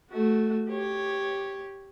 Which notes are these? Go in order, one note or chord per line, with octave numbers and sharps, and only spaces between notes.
A3 F#4
G4 C#5